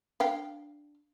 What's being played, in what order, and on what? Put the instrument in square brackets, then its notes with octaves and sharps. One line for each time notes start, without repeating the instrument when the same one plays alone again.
[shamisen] D4 F5 G5